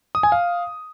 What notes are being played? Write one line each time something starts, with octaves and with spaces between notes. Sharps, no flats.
D#6
G#5
F5